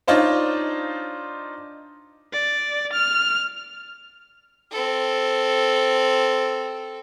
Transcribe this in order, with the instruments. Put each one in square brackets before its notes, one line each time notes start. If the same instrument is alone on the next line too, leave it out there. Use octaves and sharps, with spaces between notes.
[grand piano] D4 D#4 F4 C5 C#5
[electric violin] D5
F6
[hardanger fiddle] C4 A4